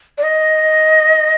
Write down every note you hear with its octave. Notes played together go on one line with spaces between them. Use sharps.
D5
D#5